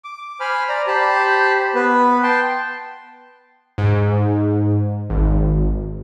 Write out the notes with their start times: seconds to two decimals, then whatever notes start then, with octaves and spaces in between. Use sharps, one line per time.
0.04 D6
0.40 C5 G#5 B5 F6
0.69 D5 A#5
0.87 G4 C5 A5 B5
1.75 B3 B4
2.23 G5 A5 C6
3.78 G#2
5.10 G#1